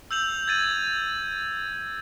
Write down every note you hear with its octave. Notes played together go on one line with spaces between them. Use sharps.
E6 G6 F7 F#7
G#6 A6 D#7